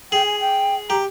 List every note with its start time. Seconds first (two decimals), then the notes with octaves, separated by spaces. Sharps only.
0.12 G#4 G5
0.26 G#5
0.40 G5
0.89 G4 A#5